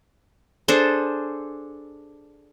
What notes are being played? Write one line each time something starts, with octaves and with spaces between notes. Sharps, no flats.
D4 G#4 A4 C5